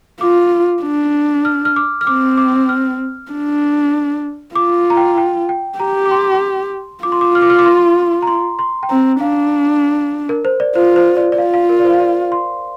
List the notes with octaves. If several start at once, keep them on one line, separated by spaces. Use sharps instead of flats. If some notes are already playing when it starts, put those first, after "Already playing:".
F4 D6
D4
F6
F6
D6
F6
C4 D6
D6
F6
D4
F4 D6
A#5
G5
G5
G5
G4 A#5
D6
C6
F4 D6
C6
D6
F6
D6
F6
D6
C6
A#5
C6
C6
G5
C4 A#5
D4 F5
A#4
C5
D5
F4 C5
C5
D5
D5
F4 F5
F5
A#4
D5
C5
F5
D5
C6